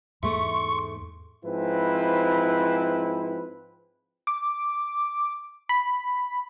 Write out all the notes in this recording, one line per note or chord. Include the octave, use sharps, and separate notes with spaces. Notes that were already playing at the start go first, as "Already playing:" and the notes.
E2 G#2 A3 G#4 E5 C6 C#6
G#2 F3 C4 E4 B4
D6
B5